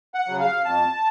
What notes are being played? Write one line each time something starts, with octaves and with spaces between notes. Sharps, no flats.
F#5
C#3 F#3
F5
F2 A5